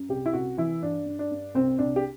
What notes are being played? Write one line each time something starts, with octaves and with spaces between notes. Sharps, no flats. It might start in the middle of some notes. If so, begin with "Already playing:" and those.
Already playing: F#2
C2 G4
E4
C2 F#4
E3 E4
G2 D4
G2
D4
G2
C2 C4
C2 D4
G4